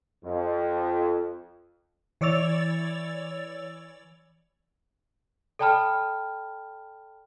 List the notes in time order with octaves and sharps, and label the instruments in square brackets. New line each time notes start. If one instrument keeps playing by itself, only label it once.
[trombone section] F2
[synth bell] E3 C#5 D5 E6 A6 F7
[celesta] A4 D5 G5 A5 B5 F6